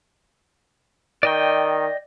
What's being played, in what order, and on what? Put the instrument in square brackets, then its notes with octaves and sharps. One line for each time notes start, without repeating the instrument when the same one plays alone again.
[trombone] D#3 [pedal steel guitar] D5 D#5 G5